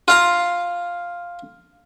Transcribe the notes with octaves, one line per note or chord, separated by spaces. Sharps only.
F4 F5 A#5